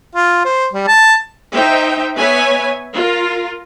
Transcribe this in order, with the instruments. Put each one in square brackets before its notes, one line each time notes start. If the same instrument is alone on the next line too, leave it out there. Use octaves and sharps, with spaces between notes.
[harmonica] F4
C5
G3
A5
[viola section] D#4 C5 E5 G5
B3 B4 C#5 E5 G#5
F4 A#4